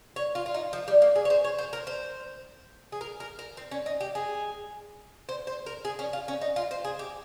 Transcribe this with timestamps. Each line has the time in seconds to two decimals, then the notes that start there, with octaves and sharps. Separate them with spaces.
0.16 C#5
0.35 F4
0.46 F4
0.54 D#4
0.73 F3
0.88 G3
1.02 A#3
1.16 G#4
1.25 C#5
1.30 C5
1.44 C#5
1.58 C5
1.73 A#4
1.87 C5
2.92 G#4
3.01 A#4
3.20 A#4
3.39 A#4
3.57 C4
3.71 C#4
3.86 D#4
4.01 G4
4.15 G#4
5.29 C5
5.47 C5
5.66 A#4
5.85 G#4
5.99 C#4
6.13 F4
6.28 C#4
6.41 D#4
6.56 F4
6.71 C5
6.85 G#4
6.99 G4